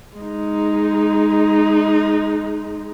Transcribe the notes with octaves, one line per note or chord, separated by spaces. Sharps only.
G#3 D#4